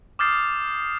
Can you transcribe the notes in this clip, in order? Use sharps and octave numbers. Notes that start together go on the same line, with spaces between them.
D6 D#6 F6 G6 A6 C7